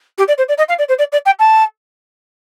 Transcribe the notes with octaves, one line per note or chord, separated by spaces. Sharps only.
G4
D5
C5
D5
D#5
F5
D5
C5
D5
D5
G5
A5